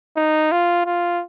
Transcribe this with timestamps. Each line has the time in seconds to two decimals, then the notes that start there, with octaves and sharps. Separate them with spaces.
0.17 D#4
0.52 F4
0.86 F4